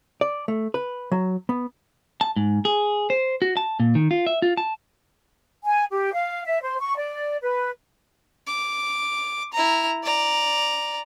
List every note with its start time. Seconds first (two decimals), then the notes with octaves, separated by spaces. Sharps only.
0.21 D5
0.48 A3
0.74 B4
1.12 F#3
1.49 B3
2.21 A5
2.36 G#2
2.65 G#4
3.10 C5
3.42 F#4
3.57 A5
3.80 A#2
3.95 D#3
4.11 F4
4.26 E5
4.42 F4
4.57 A5
5.66 G#5
5.91 G4
6.13 F5
6.45 E5
6.61 C5
6.80 C#6
6.96 D5
7.42 B4
8.47 D6
9.53 E4 A#5
10.04 D5 A#5